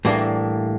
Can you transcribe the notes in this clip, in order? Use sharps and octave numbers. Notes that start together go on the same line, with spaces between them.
A2 E3 G3 A#3 D4